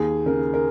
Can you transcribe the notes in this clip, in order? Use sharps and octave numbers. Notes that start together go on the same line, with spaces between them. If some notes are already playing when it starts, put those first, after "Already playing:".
Already playing: D#2 G#4
C#3 A#4
A#4